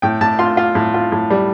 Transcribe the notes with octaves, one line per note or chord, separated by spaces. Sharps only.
A2 G5
A2 A5
F4 C6
F4 C6
A2
F4
A2
G3